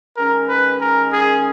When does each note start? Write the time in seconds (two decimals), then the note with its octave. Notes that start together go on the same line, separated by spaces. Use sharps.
0.17 D#3 G#3 C#4 A#4
0.48 B4
0.81 A#4
1.13 G#4